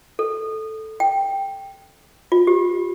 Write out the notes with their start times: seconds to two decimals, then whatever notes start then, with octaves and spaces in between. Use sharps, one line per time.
0.19 A4
1.00 G5
2.32 F4
2.47 G4